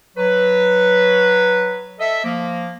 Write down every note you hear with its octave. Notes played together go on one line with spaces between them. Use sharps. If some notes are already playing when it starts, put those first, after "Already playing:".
F#3 B4
A4 D#5 E5
F3 A#3